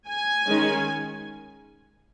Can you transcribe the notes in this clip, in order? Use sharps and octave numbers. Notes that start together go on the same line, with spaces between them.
G#5
D#3 G#3 C#4